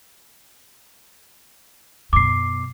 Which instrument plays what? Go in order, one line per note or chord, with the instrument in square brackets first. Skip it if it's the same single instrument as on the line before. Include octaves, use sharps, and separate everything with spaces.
[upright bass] F#2 B2 [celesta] D6 C7